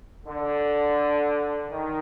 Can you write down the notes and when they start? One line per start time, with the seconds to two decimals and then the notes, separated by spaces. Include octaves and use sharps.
0.25 D3
1.69 D#3